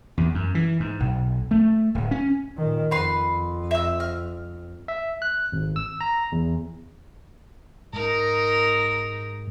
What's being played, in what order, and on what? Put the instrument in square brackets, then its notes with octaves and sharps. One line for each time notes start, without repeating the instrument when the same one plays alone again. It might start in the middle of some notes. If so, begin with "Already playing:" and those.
[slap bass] E2
F#2
E3
G#2
B1
A3
D1
C#4
[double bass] A#2 D#3
[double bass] F2 [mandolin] B4 C6
[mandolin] E5 E6
F6
[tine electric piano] E5
F#6
G#1
E6
A#5
E2
[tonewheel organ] G#2 [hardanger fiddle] D#4 A#4